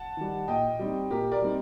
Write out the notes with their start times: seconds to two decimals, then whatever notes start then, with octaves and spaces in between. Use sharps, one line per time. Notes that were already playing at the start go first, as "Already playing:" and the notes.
Already playing: F#5 A5
0.17 D#3 G3
0.48 A#2 D#5 G5
0.79 G3 C4 D#4
1.11 A#2 G4 A#4
1.31 A#4 D5
1.42 G3 C4 D#4